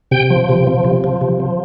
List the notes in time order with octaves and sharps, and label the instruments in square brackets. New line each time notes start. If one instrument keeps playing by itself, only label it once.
[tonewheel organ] C3 G5
F3
C3
F3
C3
F3
C3
F3